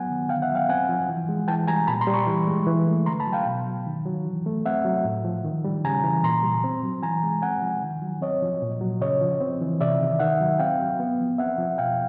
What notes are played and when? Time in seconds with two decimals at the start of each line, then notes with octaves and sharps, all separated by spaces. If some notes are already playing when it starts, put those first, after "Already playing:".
Already playing: F#3 B3 F#5 G#5
0.10 D#3
0.29 D3 F5 G5
0.42 E5 F#5
0.50 F#3
0.55 F5 G5
0.69 C4 F#5 G#5
0.89 F3
1.09 E3
1.29 G#3
1.48 E3 G5 A5
1.68 G3 G#5 A#5
1.87 A#2 A5 B5
2.01 A#5 C6
2.07 G3
2.14 B5 C#6
2.27 E3
2.47 G#3
2.67 E3
2.87 A3
3.06 D3 A#5 C6
3.20 A5 B5
3.26 F#3
3.33 F5 G5
3.46 B2
3.67 F#3
3.87 D#3
4.05 F#3
4.25 E3
4.46 A3
4.66 C4 E5 F#5
4.85 F#3
5.05 A2
5.25 F3
5.45 D#3
5.64 G3
5.84 C#3 G#5 A#5
6.04 E3
6.23 A#2 A#5 C6
6.43 G3
6.64 C4
6.83 F#3
7.02 E3 G#5 A#5
7.23 G#3
7.42 C4 F#5 G#5
7.62 F3
7.83 D#3
8.02 F#3
8.21 C4 C#5 D#5
8.42 F3
8.62 A#2
8.81 F#3
9.01 C#3 C#5 D#5
9.21 F3
9.41 C4
9.61 E3
9.81 C3 D5 E5
10.00 D#3
10.20 D#3 E5 F#5
10.41 F#3
10.59 C4 F5 G5
10.79 F#3
11.00 B3
11.20 F3
11.38 C4 E5 F#5
11.58 F3
11.78 B2 F5 G5